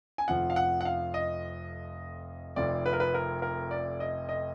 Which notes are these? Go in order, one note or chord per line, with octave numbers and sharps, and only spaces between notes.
G#5
F1 F2 F3 F#5
F5
F#5
F#5
F5
D#5
F1 F2 F3 D5
B4
A#4
B4
A#4
A#4
D5
D#5
D#5